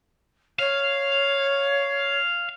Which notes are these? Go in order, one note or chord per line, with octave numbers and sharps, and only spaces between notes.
C#5 F5